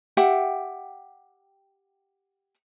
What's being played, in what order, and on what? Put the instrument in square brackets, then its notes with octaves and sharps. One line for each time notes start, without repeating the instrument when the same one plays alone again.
[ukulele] G4 E5 F#5 G5